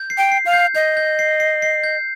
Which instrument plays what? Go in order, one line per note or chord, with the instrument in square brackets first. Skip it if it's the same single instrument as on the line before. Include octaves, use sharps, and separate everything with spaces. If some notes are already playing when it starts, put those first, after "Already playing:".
Already playing: [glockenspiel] G6
C7
[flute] G5
[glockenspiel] C7
[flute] F5
[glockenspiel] G6
[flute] D#5 [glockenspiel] G6
[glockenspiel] G6
C7
C7
C7
G6